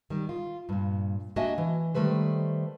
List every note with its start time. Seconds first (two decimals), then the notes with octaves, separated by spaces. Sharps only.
0.10 D#3 G3
0.29 F4
0.69 G2 A#2
1.36 A#3 D4 F#4 D#5 E5 G#5
1.58 E3
1.95 D#3 G3 A3 B4 C5